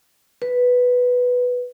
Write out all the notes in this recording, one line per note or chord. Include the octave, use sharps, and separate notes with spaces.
B4